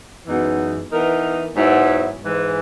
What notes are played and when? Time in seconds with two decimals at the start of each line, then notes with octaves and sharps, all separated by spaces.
0.26 F#2 E3 G#3 B3 D#4
0.91 E3 B3 D#4 A#4
1.55 G#2 F#3 B3 E4
2.20 G#2 E3 G#3